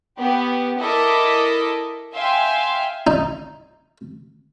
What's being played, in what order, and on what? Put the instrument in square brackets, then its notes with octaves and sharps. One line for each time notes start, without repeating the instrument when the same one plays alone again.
[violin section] B3 G4
E4 A4 A#4 D#5 D6 B6
E5 F5 G5 G#5 C6
[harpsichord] D#4